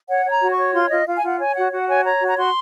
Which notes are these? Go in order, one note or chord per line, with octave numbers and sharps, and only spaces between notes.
C#5 F#5
C#5
A#5
F#4
C#6
C#5
F4 C6
F4 D#5
F4 F5
G#5
F4 F#5
C#5 G#5
F#4 F#5
F#4 F#5
C#5 G#5
C#5 A#5
F#4
A#5
F#4 C6